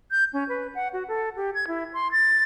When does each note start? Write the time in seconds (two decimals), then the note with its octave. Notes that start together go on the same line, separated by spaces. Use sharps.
0.11 G6
0.33 C#4
0.49 B4
0.75 F#5
0.93 F#4
1.08 A4
1.36 G4
1.55 G#6
1.68 E4
1.94 C6
2.12 A6